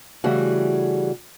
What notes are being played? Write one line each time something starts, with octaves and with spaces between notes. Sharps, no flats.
C#3 E3 G3 A3 F#4 G#4